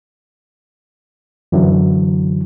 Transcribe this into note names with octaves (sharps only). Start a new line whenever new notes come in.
F#2 D3 E3 F#3